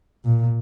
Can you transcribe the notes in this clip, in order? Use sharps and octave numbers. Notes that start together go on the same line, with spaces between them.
A#2